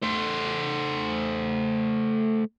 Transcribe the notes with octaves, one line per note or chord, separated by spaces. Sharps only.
A3 C5